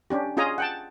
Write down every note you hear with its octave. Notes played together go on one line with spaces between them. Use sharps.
C#4 D4 G4
C#4 F4 G#4 D#5 G#5 A#5
F#5 G5 A5